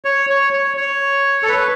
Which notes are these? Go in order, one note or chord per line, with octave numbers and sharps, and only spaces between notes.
C#5
C#5
C#5
C#5
A4
B4